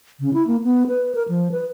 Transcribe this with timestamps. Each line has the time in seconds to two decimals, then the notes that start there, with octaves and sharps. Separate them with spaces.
0.20 C#3
0.34 E4
0.47 A#3
0.64 B3
0.87 B4
1.15 A#4
1.29 F3
1.52 B4